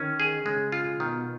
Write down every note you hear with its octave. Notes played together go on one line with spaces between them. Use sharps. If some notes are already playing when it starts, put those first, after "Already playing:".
Already playing: D#3 C#4
G#4
C#3 G#3
F4
B2 D#3